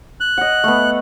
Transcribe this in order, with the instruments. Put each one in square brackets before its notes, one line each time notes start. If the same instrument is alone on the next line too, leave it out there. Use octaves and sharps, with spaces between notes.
[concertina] F#6
[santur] D#5 F#5
A3 B3